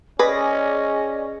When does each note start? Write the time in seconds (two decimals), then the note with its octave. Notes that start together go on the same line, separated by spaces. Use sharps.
0.19 C#4 G#4 B4 D5 D#5 A#6